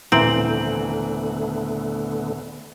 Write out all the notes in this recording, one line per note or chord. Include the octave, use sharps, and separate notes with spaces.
D#1 D3 E3 A3 B3 C4 A#5 F#7